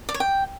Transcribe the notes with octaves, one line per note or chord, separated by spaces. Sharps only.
D5
C#5
G5